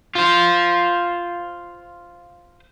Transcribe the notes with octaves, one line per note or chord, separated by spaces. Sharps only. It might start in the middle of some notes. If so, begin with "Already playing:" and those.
F4 C5